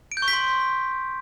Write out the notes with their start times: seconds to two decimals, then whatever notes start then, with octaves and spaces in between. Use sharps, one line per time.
0.12 D7
0.17 G6
0.22 C#6
0.28 B6
0.33 C6